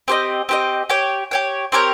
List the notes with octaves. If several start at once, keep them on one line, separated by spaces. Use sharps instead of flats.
C4 G4 C5 D#5
C4 G4 C5 D#5
G4 C#5 G5
G4 C#5 G5
C4 G4 A#4 C#5